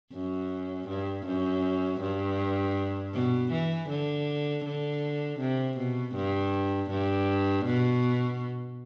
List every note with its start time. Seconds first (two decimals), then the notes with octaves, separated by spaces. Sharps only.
0.13 F#2
0.89 G2
1.26 F#2
2.01 G2
3.13 B2
3.52 E3
3.89 D3
4.65 D3
5.40 C3
5.77 B2
6.15 G2
6.90 G2
7.66 B2